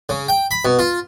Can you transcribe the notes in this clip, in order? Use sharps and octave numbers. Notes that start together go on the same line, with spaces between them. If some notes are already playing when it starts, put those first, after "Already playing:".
C#3
G5
B5
B2
F4